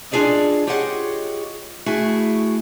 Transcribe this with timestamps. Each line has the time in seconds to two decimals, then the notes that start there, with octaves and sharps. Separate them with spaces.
0.11 D4 F4 G#4 A4 D5 D#5
0.67 F4 G4 G#4 C#5 D#5 F#5
1.86 A3 E4 F#4 G#4